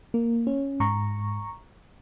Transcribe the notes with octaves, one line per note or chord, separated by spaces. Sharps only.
A#3
C#4
G#2 A#5 C#6